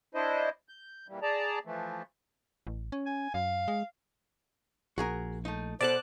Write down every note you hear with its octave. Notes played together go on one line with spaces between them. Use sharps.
D4 E4 C5 D#5
G6
A#2 E3 G3
G#4 D5 A5 A#5
E3 F3 A3
A1
C#4
G#5
F#2 F5
G#3
A#1 F#4 G#4 A#4
A3 D#4
B2 A4 C5 D5 A5 F#6